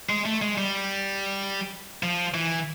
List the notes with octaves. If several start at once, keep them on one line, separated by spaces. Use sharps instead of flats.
G#3
A3
G#3
G3
F3
E3